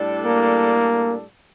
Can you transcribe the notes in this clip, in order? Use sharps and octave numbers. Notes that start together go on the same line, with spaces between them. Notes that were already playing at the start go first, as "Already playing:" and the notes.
Already playing: A2 G3 D4 A4 D5
A#3